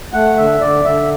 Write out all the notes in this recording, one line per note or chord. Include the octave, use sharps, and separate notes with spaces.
A3 F#5
D3 E5
D3 D5
D3 E5